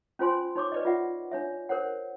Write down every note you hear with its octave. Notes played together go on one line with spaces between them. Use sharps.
C#4 F4 C5 G#5 C6
D#4 C#5 C#6 D6
B4 D5 D#5
F4 E5 F#5
D4 C#5 E5
A#4 C5 C#5 F#5